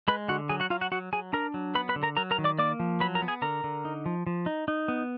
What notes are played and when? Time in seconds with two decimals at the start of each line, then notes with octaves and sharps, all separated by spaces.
0.08 G#3 B4 B5
0.28 D3 F#4 F#5
0.49 F#3 G#4 G#5
0.60 F#4 F#5
0.70 F#3 F4 F5
0.81 F#4 F#5
0.92 F#3 F#4 F#5
1.13 F#3 G#4 G#5
1.33 D4 A#4 A#5
1.54 F#3
1.75 B3 B4 B5
1.89 B4 B5
1.96 D3
2.03 A#4 A#5
2.17 F#3 A#4 A#5
2.31 A#4 A#5
2.38 D#3
2.44 D5 D6
2.59 A#3 D5 D6
2.80 F3
3.00 F#3 B4 B5
3.15 A#4 A#5
3.22 B3
3.28 G#4 G#5
3.42 D3 A#4 A#5
3.64 D3
3.85 D#4
4.06 F3
4.27 F3
4.46 D#4
4.68 D#4
4.88 B3